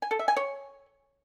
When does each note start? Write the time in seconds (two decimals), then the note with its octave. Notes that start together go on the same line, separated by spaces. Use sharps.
0.02 G#5
0.11 A4
0.19 E5
0.28 G#5
0.36 C#5